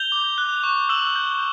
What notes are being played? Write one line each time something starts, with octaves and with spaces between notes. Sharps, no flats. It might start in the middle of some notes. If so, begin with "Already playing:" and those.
Already playing: G6 F7 G7
D6
F#6
C#6
E6 E7 F#7
G6